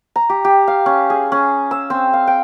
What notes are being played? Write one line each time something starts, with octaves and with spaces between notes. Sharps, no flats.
A#5
G4
G4
F5
C#4
G#4
C#4
E6
C4
F5
G5